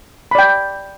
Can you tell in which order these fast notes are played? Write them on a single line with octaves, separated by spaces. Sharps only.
B5 D5 G5